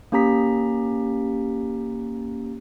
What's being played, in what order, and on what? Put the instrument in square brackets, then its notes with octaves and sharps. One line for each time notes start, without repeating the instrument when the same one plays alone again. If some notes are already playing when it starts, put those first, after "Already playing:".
[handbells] A#3 C#4 G4 A#5 B6